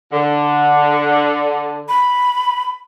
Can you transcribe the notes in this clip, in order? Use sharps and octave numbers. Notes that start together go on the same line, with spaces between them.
D3
B5